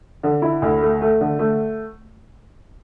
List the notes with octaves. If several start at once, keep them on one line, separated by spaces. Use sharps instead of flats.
D3
E4
D2
A3
A3
D3
A3